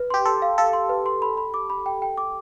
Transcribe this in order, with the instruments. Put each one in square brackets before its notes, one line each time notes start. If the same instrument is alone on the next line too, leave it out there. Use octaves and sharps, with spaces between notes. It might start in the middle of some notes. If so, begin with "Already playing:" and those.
Already playing: [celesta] B4
[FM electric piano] G4 [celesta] C6
[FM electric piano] A4 [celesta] C6
[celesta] F5
[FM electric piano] A4 [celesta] F5
[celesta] C6
B4
C6
B5
B5
D6
B5
G5
G5
D6